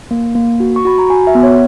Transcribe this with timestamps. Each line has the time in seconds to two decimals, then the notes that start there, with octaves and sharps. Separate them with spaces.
0.11 A#3
0.35 A#3
0.60 F#4
0.76 C#6
0.85 F#4 B5
0.98 A#5
1.10 F#4 G#5
1.27 E5
1.35 B3
1.43 C#5